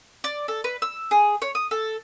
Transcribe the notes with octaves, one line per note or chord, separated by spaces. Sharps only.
D5
A4
B4
E6
G#4
C#5
D#6
A4